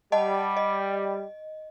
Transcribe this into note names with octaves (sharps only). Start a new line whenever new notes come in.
G3 D#5 F#5 A5
D#5